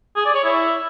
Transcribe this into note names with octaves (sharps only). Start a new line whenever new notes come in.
G#4
D5
C#5
E4